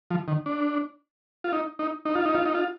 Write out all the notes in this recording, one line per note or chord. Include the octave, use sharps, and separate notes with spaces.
F3
D#3
D4
F4
D#4
D#4
D#4
F4
D#4
F4
D#4
F4